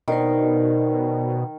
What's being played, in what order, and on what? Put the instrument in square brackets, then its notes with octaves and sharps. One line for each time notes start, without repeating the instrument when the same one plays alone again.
[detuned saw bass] B2 [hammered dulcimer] D#3 [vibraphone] A#4 C5 D5